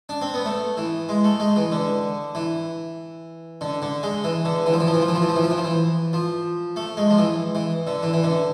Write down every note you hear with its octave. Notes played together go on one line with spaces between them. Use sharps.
D4
C4
B3
A3
E3
G#3
A3
G#3
E3
D3
E3
D3
D3
G#3
E3
D3
E3
F3
E3
F3
E3
F3
E3
F3
E3
F3
E3
F3
E3
F3
E3
F3
A3
G#3
F3
E3
E3
D3
E3
E3
D3